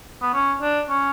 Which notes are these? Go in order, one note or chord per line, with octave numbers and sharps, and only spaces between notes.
B3
C#4
D4
C#4